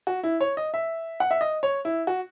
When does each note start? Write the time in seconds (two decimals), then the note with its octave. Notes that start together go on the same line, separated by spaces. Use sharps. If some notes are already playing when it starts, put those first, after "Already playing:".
0.07 F#4
0.23 E4
0.41 C#5
0.57 D#5
0.74 E5
1.20 F#5
1.31 E5
1.41 D#5
1.63 C#5
1.85 E4
2.07 F#4